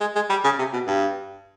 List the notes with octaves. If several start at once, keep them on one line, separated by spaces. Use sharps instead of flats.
G#3
G#3
G3
C#3
C3
B2
G2